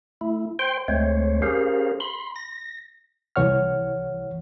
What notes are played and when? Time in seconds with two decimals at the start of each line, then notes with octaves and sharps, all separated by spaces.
0.21 A3 E4
0.59 C5 G5 C6
0.88 D2 G#3 A3 C4 C5 C#5
1.42 C#4 G4 G#4 A#4 C5 F5
2.00 B5 C6
2.36 A#6
3.36 C2 E3 C#5 F#5 F6